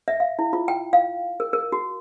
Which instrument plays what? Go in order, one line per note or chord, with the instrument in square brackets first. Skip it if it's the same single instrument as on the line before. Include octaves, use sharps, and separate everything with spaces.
[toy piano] E5
F5
E4
F4
G5
F5
A#4
A#4
F#4